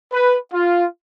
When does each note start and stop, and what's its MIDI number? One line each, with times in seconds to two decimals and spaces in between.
0.12 0.38 71
0.53 0.85 65